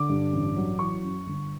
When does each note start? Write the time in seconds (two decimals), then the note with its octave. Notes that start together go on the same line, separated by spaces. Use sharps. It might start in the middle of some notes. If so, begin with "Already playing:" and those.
Already playing: D3 D6
0.09 G2
0.33 A1
0.57 F#3
0.79 E3 C#6
1.03 F#2
1.26 G1